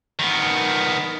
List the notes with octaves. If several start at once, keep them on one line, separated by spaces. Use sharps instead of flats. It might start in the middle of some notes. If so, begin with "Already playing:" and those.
D#3 B3